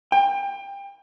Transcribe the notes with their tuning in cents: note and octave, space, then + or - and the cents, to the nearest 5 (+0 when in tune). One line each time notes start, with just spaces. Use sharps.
G5 +25